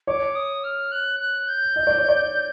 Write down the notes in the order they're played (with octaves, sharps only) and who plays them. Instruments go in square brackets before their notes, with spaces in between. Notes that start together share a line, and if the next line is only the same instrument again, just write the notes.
[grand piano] C#5 [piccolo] D6
[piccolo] D#6
F6
F#6
F#6
G6
[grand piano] D#5
D5
C#5
D5